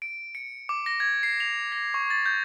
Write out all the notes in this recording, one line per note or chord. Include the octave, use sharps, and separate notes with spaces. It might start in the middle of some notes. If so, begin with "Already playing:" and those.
D7
C#7
D6
A#6
G#6
C7
F7
A#6
C#6
A6
G6